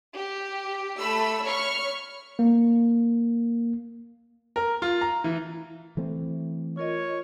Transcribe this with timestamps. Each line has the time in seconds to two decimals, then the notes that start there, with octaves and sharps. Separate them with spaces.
0.15 G4
0.98 A3 B5 E6
1.44 C#5 B5 C#6 F6
2.39 A#3
4.56 A#4
4.82 F4
5.01 A#5
5.24 E3
5.97 E3 A3 C4
6.77 F4 A#4 C#5 D#5